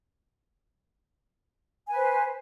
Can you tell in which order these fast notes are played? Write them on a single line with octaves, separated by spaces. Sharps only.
G#5 B4 C5